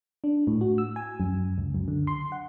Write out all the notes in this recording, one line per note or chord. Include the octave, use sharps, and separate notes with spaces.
D4
A2
F#4
E6
G#5
F#2
C#2
F#2
D3
C6
F#5